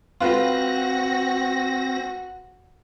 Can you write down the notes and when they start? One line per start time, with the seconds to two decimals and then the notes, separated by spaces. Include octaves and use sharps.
0.21 C4 F4 F#4 B4 A#6